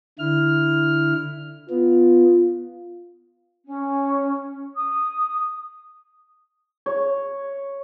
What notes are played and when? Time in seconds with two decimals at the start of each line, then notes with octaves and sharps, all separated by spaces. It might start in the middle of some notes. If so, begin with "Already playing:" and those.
0.19 D3 E4 F6
1.70 B3 F4
3.66 C#4
4.76 D#6
6.86 C#5